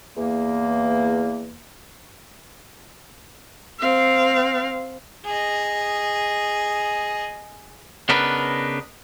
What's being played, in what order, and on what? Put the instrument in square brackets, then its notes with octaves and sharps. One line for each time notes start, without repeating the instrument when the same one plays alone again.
[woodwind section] E2 A#3
[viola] C4 F5
[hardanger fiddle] G#4 D#5
[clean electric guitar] C#3 B3 D4 D#4 A#4 B4